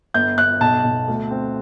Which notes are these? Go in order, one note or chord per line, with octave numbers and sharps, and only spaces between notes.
G1 G6
G1 F#6
B1 A5
B1
D2
C4